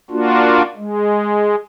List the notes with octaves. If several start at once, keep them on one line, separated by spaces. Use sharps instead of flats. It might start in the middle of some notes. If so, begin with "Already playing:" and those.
A#3 D4 F4 F#4
G#3